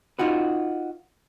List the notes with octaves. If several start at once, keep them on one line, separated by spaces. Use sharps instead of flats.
D#4 F4 F#4 B4